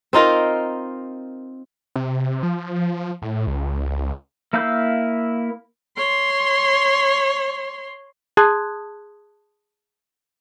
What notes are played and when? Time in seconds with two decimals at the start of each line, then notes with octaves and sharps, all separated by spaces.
0.13 C4 D#4 F4 A#4
1.96 C3
2.43 F3
3.22 A2
3.47 C#2
4.53 A#3 E4 F5 E6 G6
5.97 C#5 C6
8.37 G#4 A5 C6 D#6 F#6 G#6